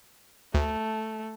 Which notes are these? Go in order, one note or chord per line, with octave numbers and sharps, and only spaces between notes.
D2 A3